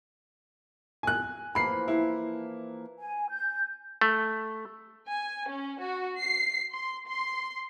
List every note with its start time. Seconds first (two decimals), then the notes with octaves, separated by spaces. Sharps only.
1.03 G#5 F#6
1.55 E3 F3 A#3 B5 C7
1.88 E4
2.98 G#5
3.30 G6
4.01 A3
5.07 G#5
5.49 C#4
5.80 F#4
6.19 C7
6.73 C6
7.08 C6